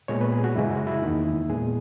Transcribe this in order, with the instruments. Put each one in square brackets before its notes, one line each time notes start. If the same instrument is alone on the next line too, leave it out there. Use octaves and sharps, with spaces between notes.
[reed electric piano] A#2 G#3 B3 C#5
B4
G#4
F#4
F#2 C#3 G#3 E4
F#4
E4
E2 D#3 A#3 D#4
E4
A#2 G#3 B3 G#4